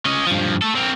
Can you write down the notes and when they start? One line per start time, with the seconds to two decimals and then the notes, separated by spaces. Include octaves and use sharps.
0.06 C#4 D#5
0.27 G2 F3
0.62 A3 A4
0.75 C4 A#4